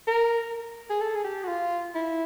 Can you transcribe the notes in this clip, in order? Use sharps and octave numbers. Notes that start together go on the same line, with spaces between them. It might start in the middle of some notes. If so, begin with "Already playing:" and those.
A#4
G#4
A4
G#4
G4
F#4
F4
E4